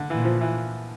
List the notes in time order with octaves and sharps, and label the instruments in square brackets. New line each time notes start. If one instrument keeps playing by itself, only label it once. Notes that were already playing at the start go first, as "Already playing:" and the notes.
Already playing: [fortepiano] D3
[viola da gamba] A#2 [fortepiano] E3
[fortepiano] F3
E3